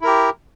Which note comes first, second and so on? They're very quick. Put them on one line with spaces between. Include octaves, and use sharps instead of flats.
E4 A#4 G4